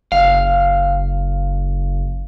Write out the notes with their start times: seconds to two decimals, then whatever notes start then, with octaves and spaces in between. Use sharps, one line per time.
0.12 F#1 F5